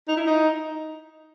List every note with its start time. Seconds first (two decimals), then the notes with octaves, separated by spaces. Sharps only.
0.08 D#4
0.17 E4
0.27 D#4